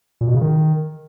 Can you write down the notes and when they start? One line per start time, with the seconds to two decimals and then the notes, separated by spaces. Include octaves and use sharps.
0.21 A#2
0.28 B2
0.34 C#3
0.41 D#3